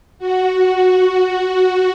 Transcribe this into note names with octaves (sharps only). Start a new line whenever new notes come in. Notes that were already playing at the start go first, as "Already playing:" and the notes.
F#4
F#4